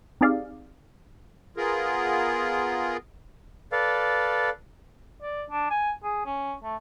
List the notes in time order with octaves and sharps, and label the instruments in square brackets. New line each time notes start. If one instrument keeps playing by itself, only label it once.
[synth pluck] C4 D#4 G4 G#4 D5 F5
[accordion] B3 F4 G#4 A#4
[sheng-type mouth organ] A4 B4 D5 F5
[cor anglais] D5
D4
G#5
G#4
C#4
A3